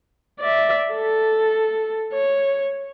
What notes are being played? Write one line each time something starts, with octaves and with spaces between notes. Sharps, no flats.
D5 E5
A4
C#5